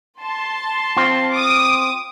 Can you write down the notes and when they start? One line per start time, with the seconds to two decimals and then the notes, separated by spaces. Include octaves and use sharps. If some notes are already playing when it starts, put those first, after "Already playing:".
0.22 A5 C6
0.97 C4 F4
1.32 D6 D#6